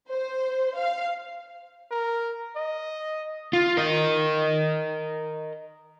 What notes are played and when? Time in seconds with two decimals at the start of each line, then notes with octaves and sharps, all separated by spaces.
0.10 C5
0.79 F5
1.91 A#4
2.56 D#5
3.53 F4
3.77 A#4 D#5